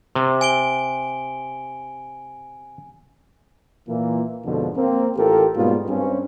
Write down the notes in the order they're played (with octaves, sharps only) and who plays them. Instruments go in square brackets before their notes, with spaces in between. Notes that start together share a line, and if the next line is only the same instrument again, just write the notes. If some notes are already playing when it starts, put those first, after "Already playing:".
[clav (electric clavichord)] C3
[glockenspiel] G#5 D7 G7
[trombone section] A#2 E3 A#3
F2 G#2 B2 D3 F3
A#3 C4
A1 F4 G4 A4 A#4
G#2 B2 G3 A#3 B3 F4
G2 C4 C#4